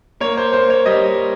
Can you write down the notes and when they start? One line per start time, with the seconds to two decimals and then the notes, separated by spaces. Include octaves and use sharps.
0.21 A#3 C#5
0.37 C5
0.53 A#3 C5
0.70 C#5
0.86 G3 D#5